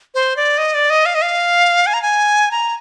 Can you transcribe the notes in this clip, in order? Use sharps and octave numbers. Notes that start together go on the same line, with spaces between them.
C5
D5
D#5
D5
D#5
F5
D#5
F5
G#5
A#5
G#5
A#5